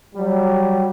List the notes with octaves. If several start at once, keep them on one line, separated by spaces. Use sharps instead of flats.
F#3 G3